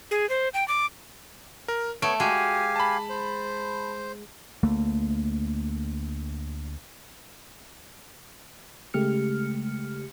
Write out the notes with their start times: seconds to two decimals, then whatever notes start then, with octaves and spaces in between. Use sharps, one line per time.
0.11 G#4
0.30 C5
0.54 G5
0.68 D6
1.68 A#4
2.02 A3 B3 C#5 C#6 D7
2.20 G#3 F#4 G4 F5 G#5
2.76 A5 B5
3.09 C5
4.63 D2 A3 A#3
8.94 C#3 G#3 A3 G4 F6 C#7